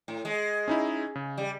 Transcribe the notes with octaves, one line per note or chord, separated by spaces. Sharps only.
A2
G#3
C#4 D#4 E4
C#3
G3